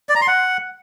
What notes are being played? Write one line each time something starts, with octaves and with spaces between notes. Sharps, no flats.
D5
A#5
C6
F#5